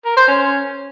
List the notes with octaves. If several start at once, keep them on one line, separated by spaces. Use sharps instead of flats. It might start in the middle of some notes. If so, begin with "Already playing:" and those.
A#4
C5
C#4